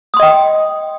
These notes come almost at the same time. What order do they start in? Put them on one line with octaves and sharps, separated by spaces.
D#6 C6 D#5 G5